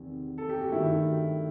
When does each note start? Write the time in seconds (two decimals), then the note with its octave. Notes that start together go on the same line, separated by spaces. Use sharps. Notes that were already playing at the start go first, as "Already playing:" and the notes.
Already playing: E2 C3 D#3
0.38 A4
0.49 G4
0.61 F#4
0.72 G2 D#3 A3 E4